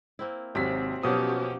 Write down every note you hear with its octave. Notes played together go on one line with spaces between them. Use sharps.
A#3 C4 E4
G#1 C3 F#3 C4 B6
B2 F3 F#3 C#4 F#4 G4 D#6